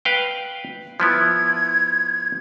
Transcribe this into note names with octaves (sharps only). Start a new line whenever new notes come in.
B4 F5 G5
F3 B3 E4 G#6